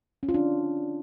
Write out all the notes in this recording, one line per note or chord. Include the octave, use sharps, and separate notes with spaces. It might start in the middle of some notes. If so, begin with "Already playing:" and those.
C#4
F4
D4